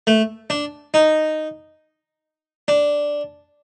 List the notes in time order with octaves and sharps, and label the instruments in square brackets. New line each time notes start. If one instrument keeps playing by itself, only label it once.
[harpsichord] A3
D4
D#4
D4